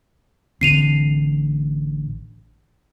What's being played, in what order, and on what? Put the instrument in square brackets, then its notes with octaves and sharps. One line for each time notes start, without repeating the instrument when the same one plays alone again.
[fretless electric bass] A1 D3 C4 [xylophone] C7 D#7 F7